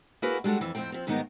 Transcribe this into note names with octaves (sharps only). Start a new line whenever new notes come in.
A#3 E4 F#4 G#4 A#4 B4
G3 G#3 D4 F#4 A4
F2 E3
F2 A2 C4 C5 G5
F3 C4
G#2 D#3 G3 B3 D#4 A#4